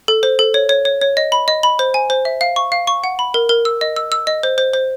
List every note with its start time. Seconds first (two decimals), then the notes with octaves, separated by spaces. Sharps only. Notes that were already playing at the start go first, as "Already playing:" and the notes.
0.08 A4
0.23 C5
0.39 A4
0.54 C#5
0.69 C#5
0.85 C#5
1.01 C#5
1.17 D#5
1.32 B5
1.48 D#5
1.63 B5
1.79 C5
1.94 G#5
2.10 C5
2.25 E5
2.41 F5
2.56 C#6
2.72 F5
2.87 C#6
3.04 F#5
3.19 B5
3.34 A#4
3.49 A#4
3.65 E6
3.81 D#5
3.96 E6
4.12 E6
4.27 D#5
4.43 C5
4.58 C5
4.74 C5